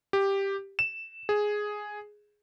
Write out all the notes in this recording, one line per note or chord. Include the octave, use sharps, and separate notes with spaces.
G4
E7
G#4